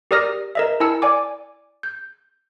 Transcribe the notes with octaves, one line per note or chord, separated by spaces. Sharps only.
G4 A#4 D5 D#6 F6 A#6
A#4 D#5 E5
E4 A#4 G#5 A5 E6 C#7
D5 G#5 D6
G6